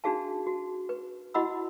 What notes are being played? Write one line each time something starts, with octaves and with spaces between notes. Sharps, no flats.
D4 D#4 F#4 G#4 F5 A5
F#4
B4
E4 F#4 D#5 F#5 B5 E6